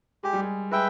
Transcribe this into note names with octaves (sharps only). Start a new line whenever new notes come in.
G#3 G4
G3
G#3
G#3 B4 E5 G5